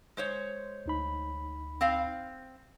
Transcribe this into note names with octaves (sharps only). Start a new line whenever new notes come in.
G#3 C5 C#5
D2 D#4 B5
C4 F5